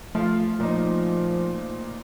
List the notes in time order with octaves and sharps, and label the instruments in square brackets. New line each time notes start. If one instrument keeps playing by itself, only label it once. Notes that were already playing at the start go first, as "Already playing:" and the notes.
[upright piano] F3 F4 [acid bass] A3
[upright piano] A#2 D#4 [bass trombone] F3